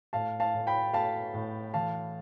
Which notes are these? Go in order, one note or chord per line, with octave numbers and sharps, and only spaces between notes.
A2 F5 A5
F5 A5
A2
G5 B5
A3 F5 A5
A2
E3 F5 A5